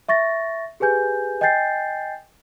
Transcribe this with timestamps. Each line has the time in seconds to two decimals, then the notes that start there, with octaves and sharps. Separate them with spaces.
0.09 E5 C#6 A6 A#6
0.80 G4 G#4 B4 G#5 G6
1.41 D#5 G5 G#5 G6 A6 C7